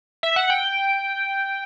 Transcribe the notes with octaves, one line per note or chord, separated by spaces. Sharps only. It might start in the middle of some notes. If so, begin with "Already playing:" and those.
E5
F#5
G5